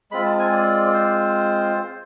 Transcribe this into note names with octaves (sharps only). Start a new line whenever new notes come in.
G#3 C4 F4 B5
A5
G#5
D5
D5
C5